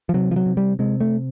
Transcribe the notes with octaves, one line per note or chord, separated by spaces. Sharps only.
F3
C3 F#3
F3
F#3
C3
G3
C3 G#3
A3